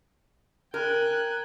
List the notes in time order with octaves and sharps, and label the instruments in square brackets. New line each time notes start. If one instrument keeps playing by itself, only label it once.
[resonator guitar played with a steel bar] A#4 [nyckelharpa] G5 G#5 [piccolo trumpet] F#6